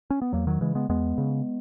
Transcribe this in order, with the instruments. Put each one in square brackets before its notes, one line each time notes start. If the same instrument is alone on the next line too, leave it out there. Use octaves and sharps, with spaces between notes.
[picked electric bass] C#4
B3
E2 F#3 A#3
D#3 F#3
C#3 E3 G#3
G#3 B3
E2 G#3 B3
C#3